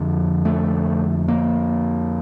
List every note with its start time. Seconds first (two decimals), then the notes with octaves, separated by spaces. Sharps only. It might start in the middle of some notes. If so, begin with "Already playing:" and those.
Already playing: F2 D3
0.45 A3
1.28 A#3